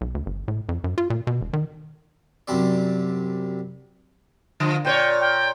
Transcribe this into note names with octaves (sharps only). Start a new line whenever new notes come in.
B1
D2
G1
A2
F2
F#2
F4
A#2
B2
E1
D#3
F#2 C3 G3 C4 D5
D3 F3
A#2 B4 C#5 G5
G5